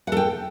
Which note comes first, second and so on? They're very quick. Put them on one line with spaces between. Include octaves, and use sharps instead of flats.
F#5 A4 G5